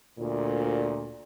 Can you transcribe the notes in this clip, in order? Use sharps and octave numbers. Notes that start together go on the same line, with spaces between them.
D2 A#2